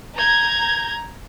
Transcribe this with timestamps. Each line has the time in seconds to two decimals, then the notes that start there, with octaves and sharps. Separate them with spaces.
0.15 A#5 G6 G#6